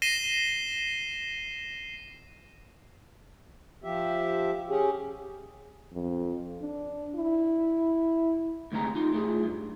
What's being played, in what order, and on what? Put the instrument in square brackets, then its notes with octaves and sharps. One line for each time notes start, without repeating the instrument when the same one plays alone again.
[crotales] A#6 C7 D#7 E7 G7
[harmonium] F3 G4 E5
C#4 G4 G#4
[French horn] F2
D4
E4
[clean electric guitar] D2 G2 C3 G#3 A#5
D#4 F4 G4
A2 F4 G#4
G2